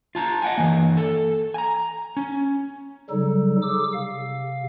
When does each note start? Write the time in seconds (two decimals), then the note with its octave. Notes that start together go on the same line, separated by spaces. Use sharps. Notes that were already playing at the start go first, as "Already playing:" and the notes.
0.15 F4 A5 A#5
0.42 D#5 F#5 G#5
0.58 E3 A#3
0.97 A4
1.54 G#5 A#5
2.17 C#4
3.10 C#3 F#3 G3 D#4 A4
3.62 G#4 A4 D6 E6
3.93 C3 F5